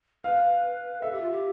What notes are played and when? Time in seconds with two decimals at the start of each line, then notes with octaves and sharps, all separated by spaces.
0.24 B4 F5
1.02 A4 E5
1.11 G4
1.21 F4
1.31 G4